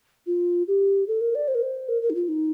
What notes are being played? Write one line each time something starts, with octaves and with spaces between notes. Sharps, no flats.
F4
G4
A4
A#4
D5
C5
A#4
C5
A#4
A#4
D#4
F4
D#4